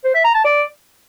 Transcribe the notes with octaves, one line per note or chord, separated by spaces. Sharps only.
C5
E5
A#5
A5
D5